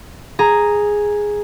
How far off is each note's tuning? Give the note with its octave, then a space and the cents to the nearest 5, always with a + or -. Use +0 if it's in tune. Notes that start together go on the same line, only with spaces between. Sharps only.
G#4 +0 A#5 +0